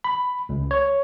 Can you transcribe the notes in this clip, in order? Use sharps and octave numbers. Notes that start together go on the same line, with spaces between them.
B5
C#2
C#5